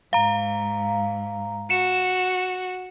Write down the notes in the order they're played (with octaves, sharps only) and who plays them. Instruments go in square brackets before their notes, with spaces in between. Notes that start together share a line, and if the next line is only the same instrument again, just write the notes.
[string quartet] G#2 [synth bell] F5 A#5
[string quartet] F#4 [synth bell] C#7 E7